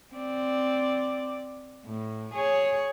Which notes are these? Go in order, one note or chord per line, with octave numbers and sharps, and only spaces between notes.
C4 D5
A2
G#4 C#5